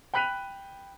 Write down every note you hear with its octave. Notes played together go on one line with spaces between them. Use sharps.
G5 B5 F#6 B6 D#7 F7